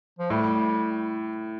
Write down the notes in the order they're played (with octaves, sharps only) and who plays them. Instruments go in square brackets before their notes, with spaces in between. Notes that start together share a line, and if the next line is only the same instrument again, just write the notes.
[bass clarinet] F3
[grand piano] A2 [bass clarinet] G3